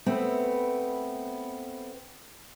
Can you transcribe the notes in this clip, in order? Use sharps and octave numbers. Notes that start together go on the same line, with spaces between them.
A3 B3 C4 B4